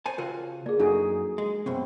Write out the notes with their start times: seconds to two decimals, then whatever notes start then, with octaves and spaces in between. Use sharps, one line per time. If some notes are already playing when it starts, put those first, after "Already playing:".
0.06 C5 G#5 A5
0.18 C#3 F4 F#4 A#4 C#5 G5
0.66 A#3 G#4 D5
0.79 F#2 D4 D#4 F#4 G#4 A4 G#5
1.38 G#3
1.66 C#2 F#2 B2 C4